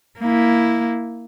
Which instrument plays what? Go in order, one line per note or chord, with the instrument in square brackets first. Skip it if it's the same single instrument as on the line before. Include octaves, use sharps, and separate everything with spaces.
[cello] A#3 E4